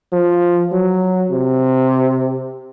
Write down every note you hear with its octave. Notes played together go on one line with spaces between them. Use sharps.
F3
F#3
C3